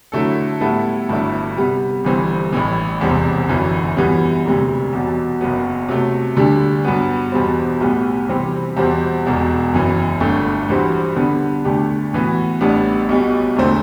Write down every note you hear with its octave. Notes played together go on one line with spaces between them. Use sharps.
D3 F#3 A3 E4 A4
A2 G3 B3 E4 A4
G1 G2 F#3 A3 E4
C3 G3 B3
G1 G2 E3 G3 C4
A1 A2 E3
E1 E2 C3 G3 C4
G1 F#2 E3
F#2 E3 G3 B3
E1 D2 C3 G3
E2 B2 F#3
F#1 F#2 F#3 B3
C3 F#3 A3
D2 D3 G3 D4
G2 F#3 B3
E2 B2 G3 C4
B1 A2 G3 B3
C3 E3 G3 C4 G4
E2 B2 G3 C4 G4
E1 E2 B2
F#1 F#2 E3
G1 G2 D3 A3
G2 E3 G3 C4 F#4
D3 G3 B3 D4
D2 D3 A3 D4 G4
A2 E3 B3 F#4
A1 A2 G3 B3 D4
B1 B2 G3
E1 D2 D3 A3 C4